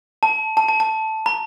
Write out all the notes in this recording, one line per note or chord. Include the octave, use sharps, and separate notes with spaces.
A5
A5
A5
A5
A#5